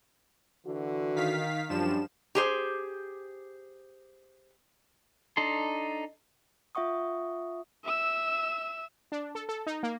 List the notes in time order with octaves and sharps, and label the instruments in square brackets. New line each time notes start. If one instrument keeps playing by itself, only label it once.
[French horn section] D3 E3 F#4
[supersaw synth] D#3 F5 B6
[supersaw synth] F#2 F3 E7 [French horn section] G3 D4
[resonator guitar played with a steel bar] G4 G#4 C5
[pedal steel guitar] D4 D#4 A4 C6
[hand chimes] F4 E5 F#5 C#6 D#6
[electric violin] E5 E6
[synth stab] D4
A4
A4
D#4
A#3